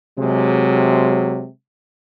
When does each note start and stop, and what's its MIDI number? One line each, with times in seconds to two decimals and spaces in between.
0.18 1.48 48
0.18 1.45 54
0.18 1.48 56